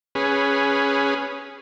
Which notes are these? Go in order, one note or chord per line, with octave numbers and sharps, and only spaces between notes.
C#4 G#4 B4